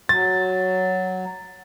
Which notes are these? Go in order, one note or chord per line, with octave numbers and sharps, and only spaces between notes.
F#3 A6